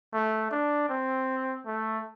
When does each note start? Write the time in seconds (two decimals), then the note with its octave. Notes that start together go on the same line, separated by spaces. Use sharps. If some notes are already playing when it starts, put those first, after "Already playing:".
0.13 A3
0.51 D4
0.89 C4
1.66 A3